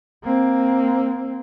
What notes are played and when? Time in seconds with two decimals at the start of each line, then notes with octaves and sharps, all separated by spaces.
0.23 A#3 C4